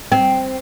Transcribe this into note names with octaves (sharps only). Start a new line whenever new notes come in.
C4